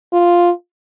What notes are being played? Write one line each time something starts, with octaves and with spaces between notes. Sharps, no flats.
F4